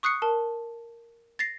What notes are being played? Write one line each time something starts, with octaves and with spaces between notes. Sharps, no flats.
C#6 D#6 F#6 C7 C#7
A#4 A5
A6 A#6 C7